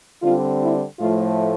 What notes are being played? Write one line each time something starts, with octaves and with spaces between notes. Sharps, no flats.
D3 G3 C4 F4
E4
A2 F3 A3 F4